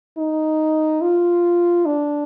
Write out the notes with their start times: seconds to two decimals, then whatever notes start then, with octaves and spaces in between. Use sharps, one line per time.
0.18 D#4
1.01 F4
1.86 D4